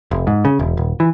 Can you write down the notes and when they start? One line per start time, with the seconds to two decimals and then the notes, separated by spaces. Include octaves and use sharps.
0.11 F1
0.27 G#2
0.45 C#3
0.59 E1
0.77 D#1
1.00 E3